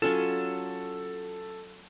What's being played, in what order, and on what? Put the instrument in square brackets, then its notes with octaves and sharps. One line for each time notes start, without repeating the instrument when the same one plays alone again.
[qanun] F#3 C#4 F4 [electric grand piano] A4 E7